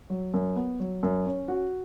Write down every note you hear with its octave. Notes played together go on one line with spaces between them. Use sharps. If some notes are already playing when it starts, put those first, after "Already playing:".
F#3
F#2
B3
F#3
F#2
C#4
F#4